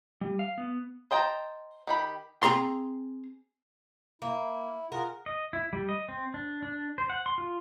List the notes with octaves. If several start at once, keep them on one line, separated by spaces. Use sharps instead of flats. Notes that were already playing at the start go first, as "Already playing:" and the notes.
G3
F5
B3
C5 D#5 G5 A5 A#5
D#3 G4 B5
C4 G#4 A#5 C6
A#3 E4
F4 G#4 A#4 F#5
D#5
E4
G3
D#5
C4
D4
D4
C5
F#5
C6
F4